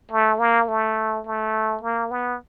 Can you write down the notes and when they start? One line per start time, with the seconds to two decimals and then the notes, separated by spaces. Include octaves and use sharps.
0.12 A3
0.39 A#3
0.68 A3
1.26 A3
1.83 A#3
2.11 B3